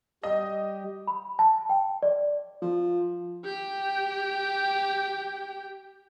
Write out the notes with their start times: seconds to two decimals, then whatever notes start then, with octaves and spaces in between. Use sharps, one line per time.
0.23 G3 G4 D#5
1.07 B5
1.39 A5
1.69 G5
2.03 D5
2.62 F3
3.45 G4 G5